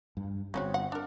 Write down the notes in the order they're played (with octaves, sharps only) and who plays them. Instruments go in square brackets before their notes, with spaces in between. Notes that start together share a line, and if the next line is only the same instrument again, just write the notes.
[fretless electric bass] G2
[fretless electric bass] G1 C4 [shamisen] C#3 C#4 F#4
[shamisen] F#5
D4 A#4